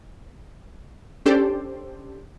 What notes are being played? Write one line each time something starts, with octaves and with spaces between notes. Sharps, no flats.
C#4 D4 G4 A4 C5 D5